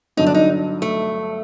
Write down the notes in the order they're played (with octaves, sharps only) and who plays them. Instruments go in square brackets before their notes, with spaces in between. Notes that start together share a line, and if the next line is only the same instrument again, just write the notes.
[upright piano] G1 G2 D3 F#3 [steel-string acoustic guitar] D#4
[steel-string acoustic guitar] D4
D#4
A3